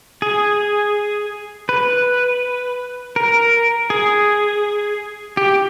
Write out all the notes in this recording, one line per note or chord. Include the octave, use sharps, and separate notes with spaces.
G#4
B4
A#4
G#4
G4